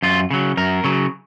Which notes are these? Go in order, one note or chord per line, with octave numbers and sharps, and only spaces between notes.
F#2 F4
C#3 F#3
F#2 A#4
C#3 F#3